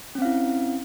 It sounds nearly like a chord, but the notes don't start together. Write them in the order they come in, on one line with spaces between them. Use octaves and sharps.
C#4 C4 F5 E4